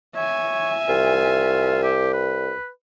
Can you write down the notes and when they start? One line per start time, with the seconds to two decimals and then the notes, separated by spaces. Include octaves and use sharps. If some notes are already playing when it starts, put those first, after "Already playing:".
0.16 C#5 E5 G#5
0.89 C2 F4
1.83 G4
2.13 B4